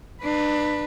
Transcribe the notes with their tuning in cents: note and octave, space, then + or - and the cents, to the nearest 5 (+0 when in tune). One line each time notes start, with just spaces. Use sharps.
D4 +30 B4 +0